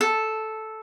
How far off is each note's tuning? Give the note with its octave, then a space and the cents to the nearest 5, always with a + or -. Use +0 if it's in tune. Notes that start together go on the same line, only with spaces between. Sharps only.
A4 -5